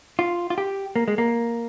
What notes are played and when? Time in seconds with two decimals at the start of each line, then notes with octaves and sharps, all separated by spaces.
0.19 F4
0.50 F4
0.58 G4
0.96 A#3
1.08 G#3
1.18 A#3